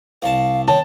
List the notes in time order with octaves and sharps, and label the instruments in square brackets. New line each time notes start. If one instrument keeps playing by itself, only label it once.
[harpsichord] C2 A5 [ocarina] F5
[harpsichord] D#3 [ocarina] C#5 [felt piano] A5